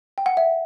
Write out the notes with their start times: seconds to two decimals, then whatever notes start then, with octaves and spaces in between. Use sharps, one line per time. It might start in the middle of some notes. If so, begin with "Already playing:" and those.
0.18 G5
0.26 F#5
0.37 E5